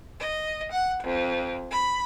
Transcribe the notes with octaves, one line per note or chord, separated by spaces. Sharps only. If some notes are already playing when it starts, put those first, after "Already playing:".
D#5
F#5
F2
B5